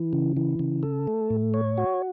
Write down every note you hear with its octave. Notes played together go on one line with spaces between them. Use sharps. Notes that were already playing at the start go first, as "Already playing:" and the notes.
Already playing: E3
C#3
E3
C#3
A4
A3
A2
C#5
F#4